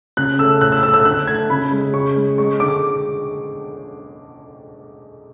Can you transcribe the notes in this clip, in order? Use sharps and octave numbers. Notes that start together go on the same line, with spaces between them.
C#3 F#6
A3 E6
A2 F#6
E6
A3 E6
E6
D3 F#6
A3 G#6
C#3 B5
G#3
C#3 C#6
G#3
G#3 C#6
D3 D6